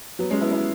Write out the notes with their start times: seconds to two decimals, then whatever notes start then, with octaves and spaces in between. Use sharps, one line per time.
0.19 F#3 B3
0.30 G#3 C#4
0.41 B3 E4
0.51 B3 E4